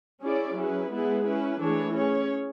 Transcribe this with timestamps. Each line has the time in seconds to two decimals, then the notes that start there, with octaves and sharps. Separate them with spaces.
0.22 C#4 E4 G#4 D5
0.57 F#3 C#4 E4 G#4 B4
0.91 G#3 B3 E4 G#4 B4
1.25 C#4 E4 B4
1.60 E3 A3 D4 G#4 C#5
1.94 C#4 G#4 C#5